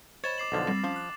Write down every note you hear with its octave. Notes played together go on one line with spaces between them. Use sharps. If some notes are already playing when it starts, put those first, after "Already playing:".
C5 C#5 D#5 B5 A6 E7
D6 C7 F#7
B1 D3 F3
G3 C4 A#6
F3 C#4 F5
F#6